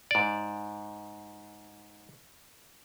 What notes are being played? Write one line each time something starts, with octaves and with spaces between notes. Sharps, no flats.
G#2 D5